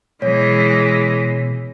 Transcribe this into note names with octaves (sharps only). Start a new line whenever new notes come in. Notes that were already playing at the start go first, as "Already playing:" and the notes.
B2 E3 G#3 C#5